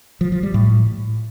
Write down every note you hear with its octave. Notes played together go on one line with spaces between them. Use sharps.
F3
F3
G3
A2